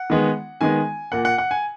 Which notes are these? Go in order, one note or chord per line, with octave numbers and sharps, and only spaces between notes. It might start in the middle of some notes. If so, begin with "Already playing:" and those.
Already playing: F#5
D#3 G#3 B3
D#3 G#3 B3 G#5
A#2 A#3 F#5
F#5
F#5
G#5